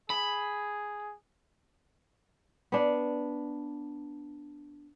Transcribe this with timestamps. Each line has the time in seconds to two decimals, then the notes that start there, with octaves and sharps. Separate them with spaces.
0.10 G#4 B5
2.72 B3 D4